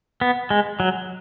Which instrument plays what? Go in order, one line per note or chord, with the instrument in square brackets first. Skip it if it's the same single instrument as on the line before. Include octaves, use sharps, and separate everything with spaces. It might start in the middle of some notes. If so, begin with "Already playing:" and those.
[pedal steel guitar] B3
G#3
F#3